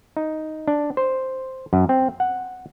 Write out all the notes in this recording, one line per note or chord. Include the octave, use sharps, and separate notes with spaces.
D#4
D4
C5
F#2
C4
F#5